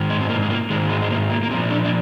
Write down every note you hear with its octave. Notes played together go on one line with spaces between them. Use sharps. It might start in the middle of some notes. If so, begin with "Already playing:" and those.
Already playing: G#2 D#3
G#3
C4
A#3
G#3
A#3
G#2 D#3 G#3
G#3
G#3
A#3
A#3
A#3
A#2 F3 C4
D4
D4